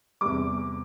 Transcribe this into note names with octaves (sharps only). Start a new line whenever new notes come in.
E2 C3 G3 D6